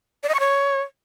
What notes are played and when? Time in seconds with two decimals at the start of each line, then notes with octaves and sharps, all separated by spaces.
0.23 D5
0.29 D#5
0.34 C#6
0.40 C#5